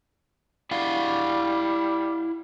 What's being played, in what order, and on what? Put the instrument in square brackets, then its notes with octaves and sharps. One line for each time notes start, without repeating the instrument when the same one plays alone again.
[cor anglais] G3 [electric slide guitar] E4 F5 F#5